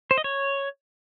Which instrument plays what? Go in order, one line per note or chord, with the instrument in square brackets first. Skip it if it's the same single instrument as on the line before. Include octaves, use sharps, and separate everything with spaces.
[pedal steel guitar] C5
D#5
C#5